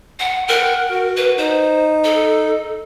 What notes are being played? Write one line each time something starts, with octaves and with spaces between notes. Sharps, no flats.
F#5
A#4 F#5 G5
F#4
B4
D#4 C5
A4